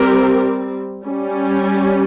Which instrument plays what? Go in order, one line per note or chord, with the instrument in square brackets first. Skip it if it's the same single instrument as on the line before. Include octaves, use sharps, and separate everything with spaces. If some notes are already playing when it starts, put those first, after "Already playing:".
Already playing: [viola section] G3 C4 G4 A#4
G3 C#4